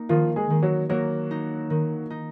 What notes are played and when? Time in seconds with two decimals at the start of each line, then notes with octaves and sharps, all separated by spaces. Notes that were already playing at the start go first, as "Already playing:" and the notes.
Already playing: A#3 D#4
0.09 D#3 F3 F4
0.36 G#3 G#4
0.50 D#3
0.63 F#3 F#4
0.89 F#3 A#3 F#4
1.31 D#4
1.70 D#3
2.10 D#4